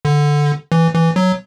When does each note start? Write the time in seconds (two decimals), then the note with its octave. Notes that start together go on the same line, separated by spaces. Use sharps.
0.05 D3
0.72 E3
0.94 E3
1.16 F#3